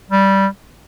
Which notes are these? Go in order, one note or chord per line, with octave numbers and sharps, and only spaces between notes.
G3